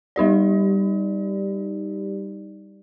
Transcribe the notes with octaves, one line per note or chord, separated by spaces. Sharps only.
G3 D#4 G4 D5